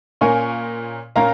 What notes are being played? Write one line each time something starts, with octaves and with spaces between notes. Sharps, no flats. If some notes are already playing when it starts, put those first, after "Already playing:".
A#2 A#3 C#4 A#4 G#5 C#6
A#2 A#3 C#4 A#4 F5 A#5